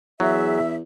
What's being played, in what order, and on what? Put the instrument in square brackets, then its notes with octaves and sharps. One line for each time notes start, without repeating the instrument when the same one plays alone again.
[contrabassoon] E2 [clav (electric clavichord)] F#3 [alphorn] G#4 [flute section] E5